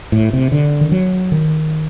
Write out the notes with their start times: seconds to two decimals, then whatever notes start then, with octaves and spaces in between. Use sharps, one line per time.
0.12 A2
0.33 C3
0.52 D3
0.81 D#3
0.92 F#3
1.32 D#3